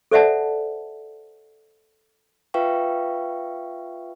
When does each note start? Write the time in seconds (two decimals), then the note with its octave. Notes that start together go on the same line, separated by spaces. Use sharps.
0.12 A4 C5 D5 E5 F#5 A5
2.54 F4 B4 E5 F5 G5 C#6